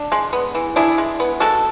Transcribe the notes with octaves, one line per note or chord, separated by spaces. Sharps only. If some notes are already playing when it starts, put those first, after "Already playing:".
Already playing: D4
G#3
B3
E3
D4 E4 G#4
G#3
B3
G#3 F#4 A4